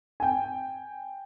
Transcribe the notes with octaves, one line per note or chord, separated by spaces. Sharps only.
G5 G#5